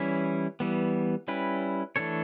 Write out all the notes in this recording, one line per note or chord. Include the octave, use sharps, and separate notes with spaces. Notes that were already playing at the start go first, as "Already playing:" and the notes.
Already playing: E3 G3 C#4 E4
E3 G3 B3
G3 C#4 E4 B4
E3 A3 D4 A4 C#5